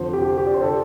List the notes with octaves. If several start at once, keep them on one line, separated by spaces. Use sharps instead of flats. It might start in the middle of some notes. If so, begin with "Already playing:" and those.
Already playing: F2 D3 C5
G4
G4
D5
C5
D3 A4